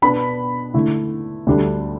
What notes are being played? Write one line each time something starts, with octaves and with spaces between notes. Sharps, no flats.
B2 B3 D4 B5
D3 A3 E4
D2 D3 G3 D4